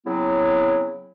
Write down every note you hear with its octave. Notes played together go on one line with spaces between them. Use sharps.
C#3 F#3 B3 C4 E4